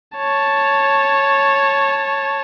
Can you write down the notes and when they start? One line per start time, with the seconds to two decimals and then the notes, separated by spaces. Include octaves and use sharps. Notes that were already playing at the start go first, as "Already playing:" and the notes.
0.18 C#5 A5